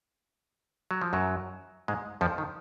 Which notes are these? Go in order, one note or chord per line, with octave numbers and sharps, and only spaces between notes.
F#3
F3
F#2 F#3
G#2 G#3
F2 F3
D#3